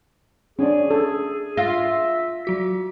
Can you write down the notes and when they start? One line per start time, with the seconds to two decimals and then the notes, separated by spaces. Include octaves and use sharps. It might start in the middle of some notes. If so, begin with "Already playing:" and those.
0.59 C#4 D4 G#4 D5
0.90 A4
1.57 F4 E5 E6 A#6
2.45 F#3 F#4 B6